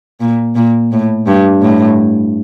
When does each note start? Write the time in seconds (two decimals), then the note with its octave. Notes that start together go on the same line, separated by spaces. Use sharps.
0.20 A#2
0.56 A#2
0.92 A2
1.27 G2
1.62 A2